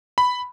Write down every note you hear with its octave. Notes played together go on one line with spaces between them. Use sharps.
B5